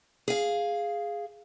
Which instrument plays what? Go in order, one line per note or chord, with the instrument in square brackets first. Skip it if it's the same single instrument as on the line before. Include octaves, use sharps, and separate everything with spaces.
[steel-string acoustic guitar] G#4 F5